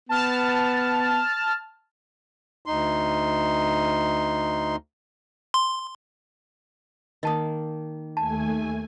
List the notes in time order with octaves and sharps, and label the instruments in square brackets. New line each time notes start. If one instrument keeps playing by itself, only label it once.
[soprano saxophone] B3 [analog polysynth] A5 F6
[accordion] D2 D#4 C6
[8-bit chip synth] C6
[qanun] D#3 A#3 [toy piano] D#5 A5 D#6
[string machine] D#2 A3 G#5 [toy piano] A5